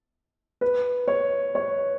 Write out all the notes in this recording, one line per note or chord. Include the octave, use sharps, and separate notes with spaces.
B4
C#5
C#5